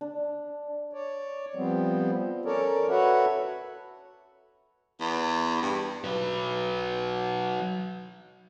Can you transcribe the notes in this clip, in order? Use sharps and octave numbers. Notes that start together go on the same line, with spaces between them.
D4
C#5 D5
F3 G3 B3 C4
C#4 A4 A#4 C#5 D5
F#4 A4 B4 C#5 E5 F#5
E2
G2
F#3 B4